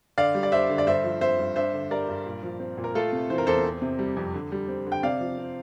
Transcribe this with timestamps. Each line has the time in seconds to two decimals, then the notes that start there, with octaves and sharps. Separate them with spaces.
0.18 D3 D5 F5
0.35 G3
0.43 D5
0.52 D4 C5 E5
0.69 D3
0.78 D5
0.87 G2 C5 E5
1.04 F3
1.21 C4 C5 E5
1.39 G2
1.56 D4 C5 E5
1.73 D3
1.91 G3 A#4 D5
2.09 G2
2.26 A#2
2.43 F3
2.60 C4
2.77 A#2
2.84 A#4
2.95 A3 F4 A4
3.12 C3
3.30 E3 C5
3.38 A#4
3.47 E2 A4 C5
3.65 C4
3.82 C3
3.99 G3
4.17 F2
4.34 D3
4.52 G3
4.68 C4
4.86 D3
4.92 G5
5.03 C3 D5 F5
5.21 F3
5.38 C4